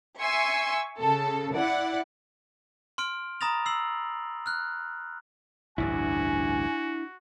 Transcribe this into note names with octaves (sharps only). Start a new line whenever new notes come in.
E5 G#5 C6 C#6 E6
C#3 A4
E4 D5 F#5
C6 F6 D7
A#5 B5 D#6 A6 A#6 F7
E6 C7 F#7
F6 F#6
A1 D2 G2 D4 E4 F#4 G#5